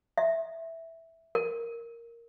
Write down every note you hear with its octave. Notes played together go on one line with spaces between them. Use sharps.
E5
A#4